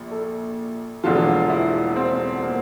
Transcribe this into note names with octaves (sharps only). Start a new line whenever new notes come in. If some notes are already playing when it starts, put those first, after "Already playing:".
Already playing: A#1 A#2
A4
E1 E2 D3 F3 F4
E4
C4
A#3